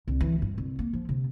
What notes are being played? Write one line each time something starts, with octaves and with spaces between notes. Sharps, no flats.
C2
E3
G2
C2
A#3
F3
C3